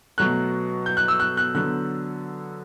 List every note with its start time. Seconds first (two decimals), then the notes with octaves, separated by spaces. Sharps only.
0.18 B2 F#3 A3 F#6
0.86 G6
0.97 F#6
1.08 E6
1.20 F#6
1.37 F#6
1.54 D3 F#3 B3 F#6